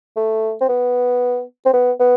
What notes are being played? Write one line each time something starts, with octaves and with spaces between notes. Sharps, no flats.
A3
C4
B3
C4
B3
B3